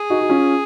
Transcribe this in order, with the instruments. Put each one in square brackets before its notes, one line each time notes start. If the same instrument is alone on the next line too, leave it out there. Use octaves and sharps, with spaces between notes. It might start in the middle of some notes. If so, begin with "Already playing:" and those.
Already playing: [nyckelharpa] G#4
[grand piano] D#4 F#4
F#4
C#4 F4